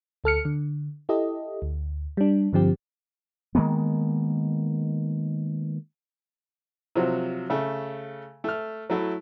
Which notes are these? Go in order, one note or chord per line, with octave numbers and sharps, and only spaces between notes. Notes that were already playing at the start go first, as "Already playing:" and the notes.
D2 A4 F6 C#7
D3
E4 G4 A4 D#5
D2
G3 D4
G2 D3 F3 C4 G4
D#3 G#3 A#3 B3
C3 F3 F#3
C#3 A3
A3 F6
F#3 A3 E4